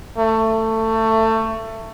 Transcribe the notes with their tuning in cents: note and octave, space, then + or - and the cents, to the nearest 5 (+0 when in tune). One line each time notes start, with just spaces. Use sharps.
A3 +20